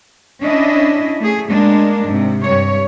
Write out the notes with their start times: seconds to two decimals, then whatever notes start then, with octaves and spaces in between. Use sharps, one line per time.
0.41 C#4 D4 E4 D#5
1.20 A3 G#4
1.49 G#3 A#3 D4
2.05 G#2 C3
2.43 G2 C#5